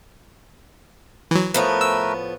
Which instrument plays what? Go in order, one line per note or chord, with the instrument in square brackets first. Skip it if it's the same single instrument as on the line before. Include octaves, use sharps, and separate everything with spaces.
[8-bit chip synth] E3 F#3
[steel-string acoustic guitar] A2 F3 B3 [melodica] A3 A#4 B4
[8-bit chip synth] E6